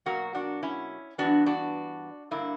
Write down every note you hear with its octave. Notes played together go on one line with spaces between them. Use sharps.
B2 F#3 A#3 F#4 A#4
D4 F#4
C#4 E4
G2 E3 B3 D4 F#4
D4 F#4
G2 D3 A#3 E4